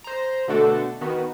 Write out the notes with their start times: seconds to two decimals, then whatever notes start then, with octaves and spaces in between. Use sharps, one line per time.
0.04 C5 A#5
0.48 B2 D3 A3 D4 F#4 A4
1.01 D#3 B3 F#4